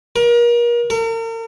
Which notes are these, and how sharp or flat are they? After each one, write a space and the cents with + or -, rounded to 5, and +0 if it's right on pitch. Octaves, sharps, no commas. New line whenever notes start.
A#4 +35
A#4 -40